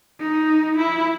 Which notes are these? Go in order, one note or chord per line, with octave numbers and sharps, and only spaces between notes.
D#4
E4